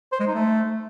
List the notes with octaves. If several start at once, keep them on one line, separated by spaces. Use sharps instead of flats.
C5
G#3
D#4
A3